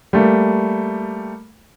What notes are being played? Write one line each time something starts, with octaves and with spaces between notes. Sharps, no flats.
G3 A3 A#3